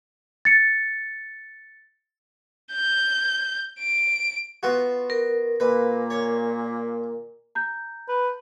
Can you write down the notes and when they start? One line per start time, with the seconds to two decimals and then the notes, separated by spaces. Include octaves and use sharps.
0.45 A6 C#7
2.73 G6
3.80 D7
4.63 B3 F4 F#4
5.10 A#4
5.60 A#2 A#3 B4
6.10 C#5
7.55 A#5 G6
8.09 B4